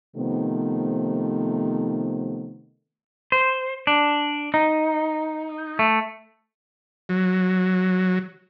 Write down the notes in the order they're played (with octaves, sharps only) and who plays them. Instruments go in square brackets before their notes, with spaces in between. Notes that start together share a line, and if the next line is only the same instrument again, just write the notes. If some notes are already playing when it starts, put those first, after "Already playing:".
[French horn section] C3 D#3 F3 A3 B3
[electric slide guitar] C5
D4
D#4
A3
[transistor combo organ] F#3